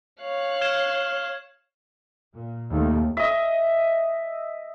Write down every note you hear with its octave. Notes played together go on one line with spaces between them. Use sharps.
C#5 F5 F#6
F6 G#6 E7
A#2
D#2 A3
D#5 E5